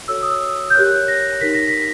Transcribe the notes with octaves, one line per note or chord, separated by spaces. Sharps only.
F#4 A4 C#5 E6
D#6
E6
G6
G4 A#4 C#5 F#6
A#6
D#4 G4 A#4 B6
A#6
B6